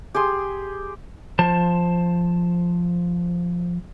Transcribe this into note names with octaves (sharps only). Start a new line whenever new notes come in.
G4 G#4 C6 D#6
F3 C5 A5